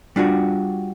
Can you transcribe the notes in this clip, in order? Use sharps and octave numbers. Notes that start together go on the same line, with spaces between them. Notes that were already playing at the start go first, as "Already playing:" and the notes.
G3 D4 F4 F#4